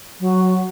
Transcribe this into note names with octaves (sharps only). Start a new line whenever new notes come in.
F#3